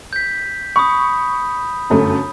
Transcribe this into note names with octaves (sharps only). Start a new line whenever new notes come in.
G6 B6
B5 C#6 D#6
G1 F#2 A3